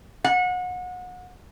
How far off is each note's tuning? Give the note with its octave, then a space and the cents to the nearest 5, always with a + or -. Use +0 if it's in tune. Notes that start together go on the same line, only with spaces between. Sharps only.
F#5 -30